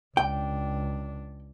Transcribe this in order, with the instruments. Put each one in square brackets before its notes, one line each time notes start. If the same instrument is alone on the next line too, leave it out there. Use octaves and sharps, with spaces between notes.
[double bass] C#2 D4 [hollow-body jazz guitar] G5